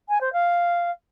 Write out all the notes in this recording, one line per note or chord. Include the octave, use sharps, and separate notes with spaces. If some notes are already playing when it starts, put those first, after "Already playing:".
G#5
C5
F5